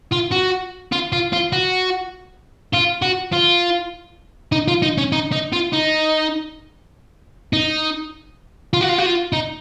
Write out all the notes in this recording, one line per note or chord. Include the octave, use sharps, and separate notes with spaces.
F4
F#4
F4
F4
F4
F#4
F4
F#4
F4
D#4
F4
D#4
C#4
D#4
D#4
F4
D#4
D#4
F4
F#4
F4
F#4
F4
D#4